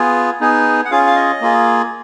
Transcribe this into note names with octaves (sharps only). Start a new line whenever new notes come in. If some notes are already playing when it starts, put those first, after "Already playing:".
Already playing: B3 F4 G#4
B3 D#4 G#4
F#5
C#4 F4 G#4 F5
F5
D#5
A#3 F4 G#4